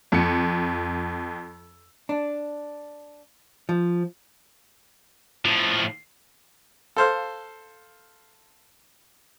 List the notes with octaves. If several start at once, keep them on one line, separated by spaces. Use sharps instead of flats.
F2 C#7
D4
F3
A2 F3
A4 C5 F5